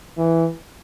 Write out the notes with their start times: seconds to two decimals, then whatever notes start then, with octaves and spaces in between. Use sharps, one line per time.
0.17 E3